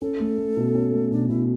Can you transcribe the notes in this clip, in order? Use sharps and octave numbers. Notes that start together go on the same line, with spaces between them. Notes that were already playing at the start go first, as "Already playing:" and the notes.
C#4 A4
A3
A3
B2
C#4
A3
B2 D4
B2 E4